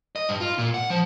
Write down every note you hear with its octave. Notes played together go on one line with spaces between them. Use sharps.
D#5
G2
F4
A#2
F#5
F3